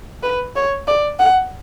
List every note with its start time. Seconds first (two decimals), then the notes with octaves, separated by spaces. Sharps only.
0.23 B4
0.56 C#5
0.87 D5
1.19 F#5